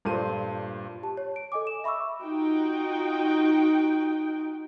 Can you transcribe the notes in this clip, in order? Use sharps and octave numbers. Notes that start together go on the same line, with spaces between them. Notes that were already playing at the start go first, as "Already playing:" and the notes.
G2 A#2 A3 C5 D#7
G4 A5
C#5
D7
A4 D#5 G#5 D6
E7
E5 B5 C#6 D6 E6
D#4 F4 F#4 G5